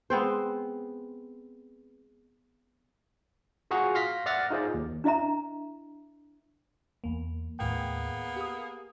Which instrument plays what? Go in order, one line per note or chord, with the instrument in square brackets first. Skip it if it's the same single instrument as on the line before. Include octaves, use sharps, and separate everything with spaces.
[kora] G#3 B3 C4 C5
[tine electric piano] F4 F#4 G#4 F#5 A#5 C#6
F5 C6 F6 A#6 B6
D5 E5 F#5 F6 A6 A#6
D#4 F4 G#4 C5 D5
D#2
[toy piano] D4 E4 D#5 E5 A#5
[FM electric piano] E2 A#3
[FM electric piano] D#2 A2 G5 [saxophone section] A#3 B3 G#4
[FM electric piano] G4 D#6